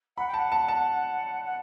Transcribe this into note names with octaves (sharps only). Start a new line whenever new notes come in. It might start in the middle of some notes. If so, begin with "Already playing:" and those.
F#5 B5
G5
F#5 A5
A5
A5
F#5